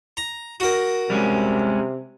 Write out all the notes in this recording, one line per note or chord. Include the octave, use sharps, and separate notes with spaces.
A#5
F#4 A#4
C3 G3 G#3 C#4